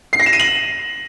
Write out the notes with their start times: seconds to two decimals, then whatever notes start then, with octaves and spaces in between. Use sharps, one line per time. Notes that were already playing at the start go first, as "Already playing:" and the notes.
0.13 C7
0.20 A#6
0.26 E7
0.33 D#7
0.40 F#7